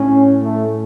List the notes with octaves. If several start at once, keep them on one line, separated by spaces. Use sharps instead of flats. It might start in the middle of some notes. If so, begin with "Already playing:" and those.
Already playing: A2 C#4
A3